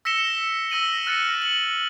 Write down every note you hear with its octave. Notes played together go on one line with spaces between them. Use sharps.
E6 A#6 B6 C#7 E7 G7
E6 A#6 D#7 F#7
F6 F#6 A6 A#6 C#7 D#7
F#7